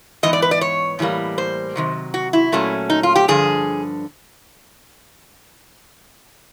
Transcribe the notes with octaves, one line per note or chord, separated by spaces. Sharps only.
G#2 E3 B3 D#5
D5
B4
D5
C#5
A2 E3 G3 A#3
C5
C3 D#3 F#3
F#4
E4
A#2 F#3 A3 C#4
D#4
F4
G4
G2 D3 F3 G#4